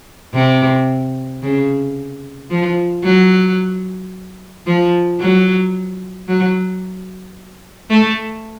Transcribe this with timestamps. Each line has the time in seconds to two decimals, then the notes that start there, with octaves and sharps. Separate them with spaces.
0.34 C3
1.42 C#3
2.50 F3
3.04 F#3
4.66 F3
5.20 F#3
6.28 F#3
7.90 A3